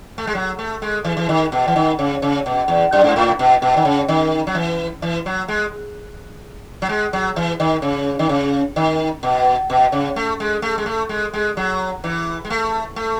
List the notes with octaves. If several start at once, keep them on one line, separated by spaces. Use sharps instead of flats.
A3
G#3
F#3
A3
G#3
E3
E3
D#3
B2
E3
D#3
C#3
C#3
B2
E2
F#2
G#2
A2
B2
B2
D#3
C#3
D#3
F#3
E3
E3
F#3
G#3
F#3
G#3
F#3
E3
D#3
C#3
D#3
C#3
D#3
B2
B2
C#3
A3
G#3
A3
G#3
A3
G#3
G#3
F#3
E3
G#3
A3
A3